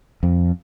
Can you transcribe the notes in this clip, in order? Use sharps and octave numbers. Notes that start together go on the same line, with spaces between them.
F2